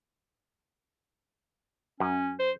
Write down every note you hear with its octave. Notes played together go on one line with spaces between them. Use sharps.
F#2 C#4
C5